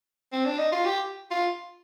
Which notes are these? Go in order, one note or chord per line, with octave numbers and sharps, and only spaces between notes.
C4
D4
D#4
F4
G4
F4